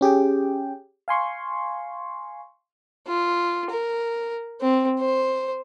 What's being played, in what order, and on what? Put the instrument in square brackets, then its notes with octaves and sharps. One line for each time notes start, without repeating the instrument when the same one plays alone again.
[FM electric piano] C#4 G4 G#4 G5
F5 G#5 C6 C#6
[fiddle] F4
A#4
C4
C5